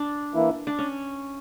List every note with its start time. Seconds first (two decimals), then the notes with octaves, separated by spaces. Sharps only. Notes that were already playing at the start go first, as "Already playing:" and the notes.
Already playing: D4
0.34 E3 A#3 E4
0.67 D4
0.79 C#4